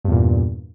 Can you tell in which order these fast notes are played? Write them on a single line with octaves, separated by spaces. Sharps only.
G2 E2 A#2